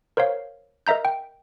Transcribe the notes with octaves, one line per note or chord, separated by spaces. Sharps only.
A#4 C5 C#5 F5
A#4 D#5 E5 A#5 G6
G5